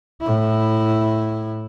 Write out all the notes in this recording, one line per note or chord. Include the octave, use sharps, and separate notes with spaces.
A2 E4